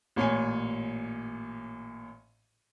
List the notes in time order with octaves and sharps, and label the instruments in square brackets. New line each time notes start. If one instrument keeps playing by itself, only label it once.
[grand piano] A1 A#2 C#5 G#5